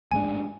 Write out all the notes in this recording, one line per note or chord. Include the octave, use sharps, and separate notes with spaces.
A1 G#2 G#3 D4 G#5